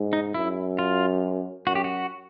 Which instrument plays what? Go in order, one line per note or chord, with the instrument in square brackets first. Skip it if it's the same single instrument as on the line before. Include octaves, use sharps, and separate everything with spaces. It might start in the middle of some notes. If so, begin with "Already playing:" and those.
Already playing: [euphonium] G#2
[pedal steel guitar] D#4
[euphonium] F#2 [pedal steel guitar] E4
[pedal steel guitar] F4
[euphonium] F#2 [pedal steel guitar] F#4
[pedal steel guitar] G4
F#4